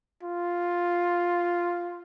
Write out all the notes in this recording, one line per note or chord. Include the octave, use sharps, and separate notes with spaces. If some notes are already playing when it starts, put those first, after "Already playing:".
F4